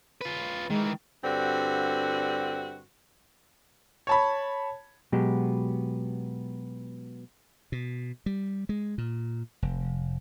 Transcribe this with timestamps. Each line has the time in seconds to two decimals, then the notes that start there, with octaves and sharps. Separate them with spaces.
0.21 F4 B4
0.70 D#3 E3 G#3
1.24 G2 D3 C4 F#4
4.07 C#5 A5 B5
5.12 B2 F#3 G#3 B3 G4
7.72 B2
8.26 G3
8.69 G#3
8.98 A#2
9.62 F1